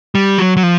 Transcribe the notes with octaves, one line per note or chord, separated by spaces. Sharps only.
G3
F#3
F#3
F3